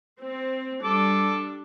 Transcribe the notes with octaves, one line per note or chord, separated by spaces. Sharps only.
C4
G3 D4 A4 D6